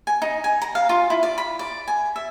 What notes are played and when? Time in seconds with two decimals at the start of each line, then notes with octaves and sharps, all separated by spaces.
0.07 G#5
0.22 D#4
0.44 G#5
0.62 A#5
0.75 F5
0.89 F4
1.10 E4
1.23 D5
1.38 B5
1.59 D5
1.88 G#5
2.16 E5